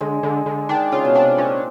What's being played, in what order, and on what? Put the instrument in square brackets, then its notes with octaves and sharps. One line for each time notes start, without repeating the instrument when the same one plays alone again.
[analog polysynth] D3 [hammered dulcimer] G#3
[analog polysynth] D3
D3
[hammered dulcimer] D#3 [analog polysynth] D4
[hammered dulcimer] C#3 [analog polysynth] F4
[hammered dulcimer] B2
[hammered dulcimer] C3 [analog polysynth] D4
[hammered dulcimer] A#2 [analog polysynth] C#4